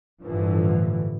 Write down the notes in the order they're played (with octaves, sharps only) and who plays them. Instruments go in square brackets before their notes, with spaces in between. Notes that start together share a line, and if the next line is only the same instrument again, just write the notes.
[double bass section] G1 A2 D3 E3 F3